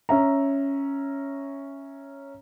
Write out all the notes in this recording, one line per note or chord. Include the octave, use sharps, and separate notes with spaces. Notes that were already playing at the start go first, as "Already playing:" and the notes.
C#4 E5 A#5